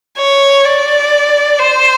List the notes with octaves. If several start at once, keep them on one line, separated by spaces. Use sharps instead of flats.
C#5
D5
C5